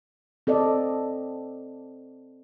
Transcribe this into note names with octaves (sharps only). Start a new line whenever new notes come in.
C4 A4 D5 D#5